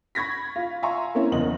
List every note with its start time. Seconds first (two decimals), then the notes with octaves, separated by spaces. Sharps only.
0.15 B5 C#6 G#6 A#6 B6
0.56 F4
0.83 E5 F5 G#5 A#5 C6 C#6
1.15 A#3 C4 C#4 E4
1.32 F#1 E2 D#5 F#7